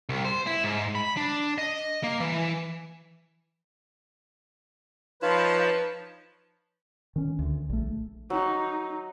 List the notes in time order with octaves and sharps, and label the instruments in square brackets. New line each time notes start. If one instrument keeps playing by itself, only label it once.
[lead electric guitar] C2
C5
E4
G#2
B5
D4
D#5
A#3
E3
[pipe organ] F3 A5 [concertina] D#4 C#5 B5 [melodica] F4 [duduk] B4
[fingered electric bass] D#3 C#4
D2
A#1 A3
[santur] F#3 [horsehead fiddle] D#4